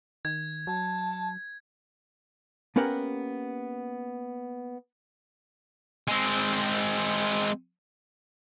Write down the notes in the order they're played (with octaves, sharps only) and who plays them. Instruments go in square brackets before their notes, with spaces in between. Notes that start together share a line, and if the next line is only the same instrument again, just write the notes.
[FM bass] D#3 [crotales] G#6
[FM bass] F#3 [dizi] A5
[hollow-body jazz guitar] A#3 B3 C#4 G4 A#4 F#5
[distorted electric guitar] G#3 C4